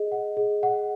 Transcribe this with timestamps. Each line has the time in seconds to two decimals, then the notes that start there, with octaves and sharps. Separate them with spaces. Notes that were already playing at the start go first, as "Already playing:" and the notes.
Already playing: G#4 D#5
0.12 F#5
0.37 G#4
0.63 F#5